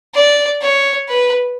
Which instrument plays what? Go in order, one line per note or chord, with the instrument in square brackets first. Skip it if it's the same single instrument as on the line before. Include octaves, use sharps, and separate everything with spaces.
[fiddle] D5
C#5
B4